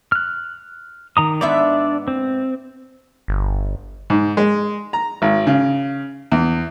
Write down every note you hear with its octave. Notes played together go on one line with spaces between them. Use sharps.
F6 F#6
D#3 A#5 D#6
G#2 B3 D4 D5 E5
C4
G1
G#2
G#3
A#5
G#1
C#3
E2